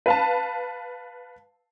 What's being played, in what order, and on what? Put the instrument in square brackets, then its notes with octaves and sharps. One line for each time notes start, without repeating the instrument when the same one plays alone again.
[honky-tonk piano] B4 F5 A5